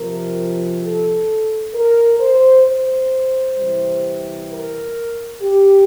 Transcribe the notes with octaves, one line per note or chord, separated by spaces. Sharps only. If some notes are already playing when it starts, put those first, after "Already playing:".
Already playing: C3 F3 A#4
A4
A#4
C5
C5
C3 E3 G3
A#4
G4